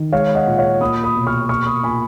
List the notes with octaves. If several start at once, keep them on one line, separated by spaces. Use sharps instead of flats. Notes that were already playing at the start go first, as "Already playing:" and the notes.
Already playing: D#3
G#3 C#5 F5
D#5 F#5
A#2
C#5 F5
A#3 B5 D#6
B5 D#6
B2
C#6 F6
A#3 C#6 F6
B5 D#6
A#2 G#5 B5